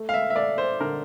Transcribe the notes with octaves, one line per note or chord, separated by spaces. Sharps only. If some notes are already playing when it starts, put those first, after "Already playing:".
Already playing: A3
F5
E5
E5
A3 D5
C5
D3 A#4